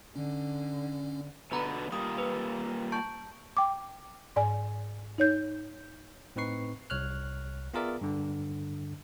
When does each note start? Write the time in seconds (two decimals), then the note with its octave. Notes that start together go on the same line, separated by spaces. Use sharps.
0.16 D3 C#4
1.52 B2 D3 B3 B4 A#5 B5
1.92 G3 A#3 F4 D#6
2.18 B4
2.92 A5 C#6 G6
3.57 G5 D6
4.36 G#2 D5 G#5
5.18 D#4 C#5 G6
6.36 A2 C4 D#4 B4 C#6 C7
6.90 C2 C#5 F6 F#6
7.74 B3 F4 G#4 A#4 D5 E5
8.01 G2 D3